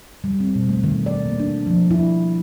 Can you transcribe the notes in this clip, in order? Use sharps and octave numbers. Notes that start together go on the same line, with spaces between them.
G3
C4
B2
A3
D#3
D5
A#3
D4
F3
E4